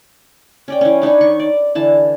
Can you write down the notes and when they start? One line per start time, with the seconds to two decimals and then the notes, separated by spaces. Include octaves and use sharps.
0.68 C#4 D5 G5
0.81 E3 C#4
1.02 D4 D#4 B4 C#5
1.21 D#3 C#6
1.40 D5
1.75 D3 E3 A5